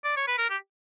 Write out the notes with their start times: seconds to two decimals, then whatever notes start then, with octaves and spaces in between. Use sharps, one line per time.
0.04 D5
0.17 C#5
0.28 B4
0.38 A#4
0.50 G4